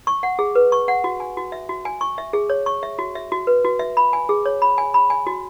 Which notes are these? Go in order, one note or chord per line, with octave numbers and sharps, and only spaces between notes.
C#6
F#5
G#4
B4
C#6
F#5
F#4
G#5
F#4
E5
F#4
G#5
C#6
E5
G#4
C#5
C#6
E5
F#4
E5
F#4
B4
F#4
E5
B5
G#5
G#4
C#5
B5
G#5
B5
G#5
F#4